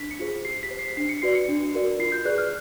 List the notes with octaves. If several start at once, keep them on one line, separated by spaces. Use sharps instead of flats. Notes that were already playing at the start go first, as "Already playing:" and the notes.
Already playing: D4 B6
C#7
F4 G#4 C5
G4 C7
B6
C5
C7
D4 C7
C#7
F#4 B4 D5 C7
C#7
D4
F#4 A#4 D5
F4 C7
G6
G#4 B4 D5 F#6
F6